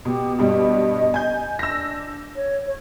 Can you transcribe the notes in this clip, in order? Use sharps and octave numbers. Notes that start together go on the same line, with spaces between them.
B2 G4
G2 B2 G3 D#5
G#5 G6
D4 E6 A#6
C#5
C#5